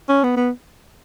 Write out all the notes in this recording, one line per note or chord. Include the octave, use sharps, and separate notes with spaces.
C#4
B3
B3